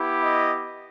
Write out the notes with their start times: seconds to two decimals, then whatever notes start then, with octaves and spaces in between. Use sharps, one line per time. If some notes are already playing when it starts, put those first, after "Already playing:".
Already playing: B3 E4 G4
0.22 D#5